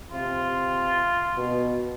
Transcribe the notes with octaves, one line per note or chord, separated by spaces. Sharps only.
C3 F4
B2